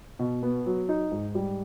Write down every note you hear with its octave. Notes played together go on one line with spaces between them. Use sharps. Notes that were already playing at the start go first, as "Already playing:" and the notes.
B2
B3
F#3
D#4
G#2
G3